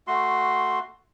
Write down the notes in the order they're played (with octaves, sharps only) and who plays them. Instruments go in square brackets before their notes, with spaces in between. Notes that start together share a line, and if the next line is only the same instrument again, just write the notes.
[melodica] A3 F#4 C6